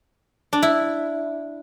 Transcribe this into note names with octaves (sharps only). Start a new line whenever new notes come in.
D4
E4